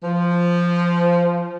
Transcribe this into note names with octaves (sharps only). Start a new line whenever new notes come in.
F3